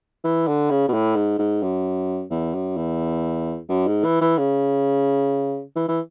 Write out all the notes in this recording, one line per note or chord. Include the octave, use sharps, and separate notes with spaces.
E3
D3
C#3
B2
A2
G#2
G#2
F#2
E2
F#2
E2
F#2
G#2
E3
E3
C#3
E3
E3